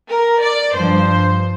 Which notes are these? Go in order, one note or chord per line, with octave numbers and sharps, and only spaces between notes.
A#4
D5
G2 F3 C5